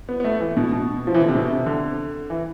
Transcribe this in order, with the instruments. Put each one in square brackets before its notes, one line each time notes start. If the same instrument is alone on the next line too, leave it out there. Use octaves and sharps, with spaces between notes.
[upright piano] B3
B3
A3
E3
B2
B2
F3
E3
D3
C3
B2
C3
D3
E3